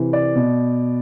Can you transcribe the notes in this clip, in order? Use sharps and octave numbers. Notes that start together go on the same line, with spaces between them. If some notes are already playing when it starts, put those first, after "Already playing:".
Already playing: C3 E3
D5
B2